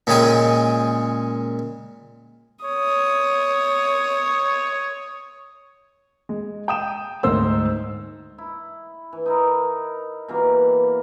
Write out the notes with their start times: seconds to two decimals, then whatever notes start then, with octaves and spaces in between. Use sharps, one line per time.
0.07 A#2 C#3 G#3 G#4 G5
2.65 C#5 D#6
6.29 G#3
6.68 G5 D#6 E7
7.23 D2 G#2 D#4 C5 E6
8.38 E4
9.13 E3
9.26 D#4 E4 A#4
10.28 B2 E3 G3 A#3